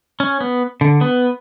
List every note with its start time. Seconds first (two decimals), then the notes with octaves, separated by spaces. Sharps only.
0.20 C#4
0.41 B3
0.81 D3
1.01 B3